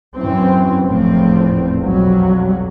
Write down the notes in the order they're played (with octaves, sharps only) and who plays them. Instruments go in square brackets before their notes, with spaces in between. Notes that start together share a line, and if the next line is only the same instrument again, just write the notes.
[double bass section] F#2 E3 C4
F1 E2 A2 F3 C4
B1 F2 F#3 G3